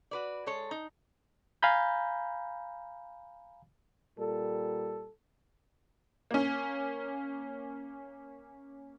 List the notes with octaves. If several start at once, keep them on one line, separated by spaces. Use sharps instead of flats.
F#4 B4 D5
G#3 A4 C#5
D#4
F5 G#5 A#5 B5 G6
A#2 G3 A4
A#3 C#4